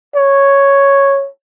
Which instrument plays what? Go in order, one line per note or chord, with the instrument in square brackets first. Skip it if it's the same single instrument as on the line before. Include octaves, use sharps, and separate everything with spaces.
[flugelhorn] C#5